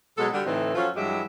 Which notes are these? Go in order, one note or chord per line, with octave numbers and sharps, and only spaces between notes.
B2 F#3 G#3 A4
D3 G3 G4
A2 D3 E3 C4 D#4 A4
F3 F#3 C#4 F4 A4
G2 E3 F#3 G#3 G4 E5